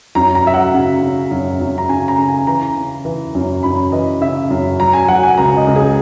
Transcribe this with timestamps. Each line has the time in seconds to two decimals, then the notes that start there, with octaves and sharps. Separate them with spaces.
0.15 F#2 A#5
0.35 A#5
0.44 F#3 E5
0.54 F#5
0.74 C#3
1.02 C#3
1.31 F#2
1.61 F#2
1.78 A#5
1.89 C#3 G#5
2.08 A#5
2.18 C#3
2.28 G#5
2.47 E3 A#5
2.76 C#3
3.05 E3
3.35 F#2
3.63 F#2 B5
3.92 E3 D#5
4.21 C#3 E5
4.50 F#2
4.80 F#3 A#5
4.93 G#5
5.08 F#3 F#5
5.23 G#5
5.38 C#2 A#5
5.57 D#5
5.67 C#2
5.76 G#4